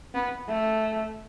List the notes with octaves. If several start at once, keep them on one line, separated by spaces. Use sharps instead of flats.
B3
A3